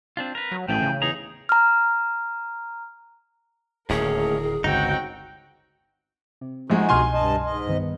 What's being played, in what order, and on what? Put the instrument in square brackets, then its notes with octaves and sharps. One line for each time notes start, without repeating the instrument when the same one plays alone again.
[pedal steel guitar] C4 D4 F4
A#4 B4
[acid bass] F#3
[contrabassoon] A1 [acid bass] A2 [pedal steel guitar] F3 A3 G#4 [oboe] G5
[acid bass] C#3
[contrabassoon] E2 [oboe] D#4 [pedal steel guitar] G#4 A#5
[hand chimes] A#5 F6
[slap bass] D1 [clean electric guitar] D#2 A2 C#4 [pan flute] G#4 [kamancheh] A#4
[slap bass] G1 C#2 [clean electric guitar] C4 D#4 [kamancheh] F#4 G5
[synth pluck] C3
[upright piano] A#1 G#3 [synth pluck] F3 [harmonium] D#4 F#4 G#4
[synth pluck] C2 B2 D#7 [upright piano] G#5 C6 F6
[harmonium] G2 D#5 A5
G#2 D#5
[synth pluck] G2 D#3 B3